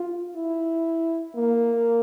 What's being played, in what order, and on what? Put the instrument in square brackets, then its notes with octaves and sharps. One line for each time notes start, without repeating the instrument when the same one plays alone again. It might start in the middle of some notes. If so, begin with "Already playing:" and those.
Already playing: [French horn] F4
E4
A#3